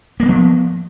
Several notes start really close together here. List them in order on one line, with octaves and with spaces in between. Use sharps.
A#3 G3 B3 F3